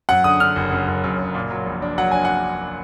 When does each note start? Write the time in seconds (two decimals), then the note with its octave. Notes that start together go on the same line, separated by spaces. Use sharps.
0.09 F#2 F#5
0.24 D3 D#6
0.40 D3 F6
0.56 F#1
0.72 F#2
0.87 F#1
1.04 F#2
1.19 F#1
1.35 A#2
1.51 F#3
1.66 A#1
1.82 D4
1.98 F#3 F#5
2.11 D4 G#5
2.25 F#5